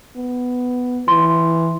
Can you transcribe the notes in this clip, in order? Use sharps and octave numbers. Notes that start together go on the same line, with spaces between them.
B3
E3 C6